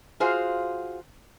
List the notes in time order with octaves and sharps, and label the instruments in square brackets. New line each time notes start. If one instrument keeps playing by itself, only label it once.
[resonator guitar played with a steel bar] F4 F#4 G#4 C5 F5